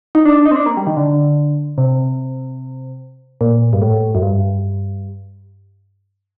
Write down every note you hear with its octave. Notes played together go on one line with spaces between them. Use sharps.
D#4
D4
D4
D#4
C4
D4
A#3
G3
D#3
D3
C3
A#2
G2
A2
F#2
G2